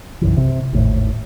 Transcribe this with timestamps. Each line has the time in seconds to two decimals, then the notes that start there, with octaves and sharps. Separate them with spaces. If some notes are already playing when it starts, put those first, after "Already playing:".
0.21 B1 F#2 C#3 E3
0.37 C3
0.73 G#1 D#2 A2